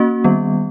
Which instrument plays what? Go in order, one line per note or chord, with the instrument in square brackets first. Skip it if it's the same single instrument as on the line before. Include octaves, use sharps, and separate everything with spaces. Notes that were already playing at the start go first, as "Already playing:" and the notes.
Already playing: [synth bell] A#3 C#4 F#4
D#3 G3 B3